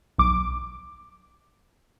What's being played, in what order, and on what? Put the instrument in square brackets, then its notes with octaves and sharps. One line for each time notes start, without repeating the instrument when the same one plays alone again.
[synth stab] B1 D6